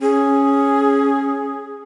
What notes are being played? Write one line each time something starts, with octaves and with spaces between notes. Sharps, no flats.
C#4 G#4